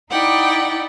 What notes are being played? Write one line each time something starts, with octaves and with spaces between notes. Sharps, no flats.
D#4 E4 D5 F#5 G5